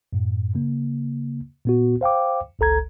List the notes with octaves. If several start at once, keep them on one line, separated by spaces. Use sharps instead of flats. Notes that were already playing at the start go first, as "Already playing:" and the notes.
F#2 A2
C#3 A#3
A#2 B3 F#4
C5 F5 G5 D6
G1 C#2 A4 A#5 G#6